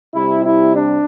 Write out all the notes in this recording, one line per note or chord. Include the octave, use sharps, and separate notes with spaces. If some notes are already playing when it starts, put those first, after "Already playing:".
C3 G3 E4
E4
D4